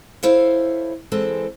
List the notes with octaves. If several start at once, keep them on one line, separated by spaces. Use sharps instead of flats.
E4 A4 C5 C#5 E5 F5
E3 G#3 C4 A4